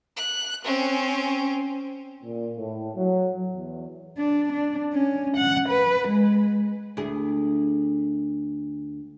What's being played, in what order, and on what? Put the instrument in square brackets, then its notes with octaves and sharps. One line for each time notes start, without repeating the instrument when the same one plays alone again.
[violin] F#6
C4 C#4
[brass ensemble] A#2
A2
F#3
E2
[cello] D4
D4
C#4
F#5
B4
G#3
[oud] D2 E4 G#4